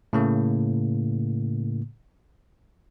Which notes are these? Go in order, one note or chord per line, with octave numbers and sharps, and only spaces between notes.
A2 C#3 A#3